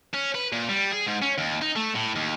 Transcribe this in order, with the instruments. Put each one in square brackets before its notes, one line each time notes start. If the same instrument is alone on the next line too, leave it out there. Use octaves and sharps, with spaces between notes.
[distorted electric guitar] C#4
B4
A#2
G3
G#4
G#2
C#4
D#2
D#4
A3
A2
D#2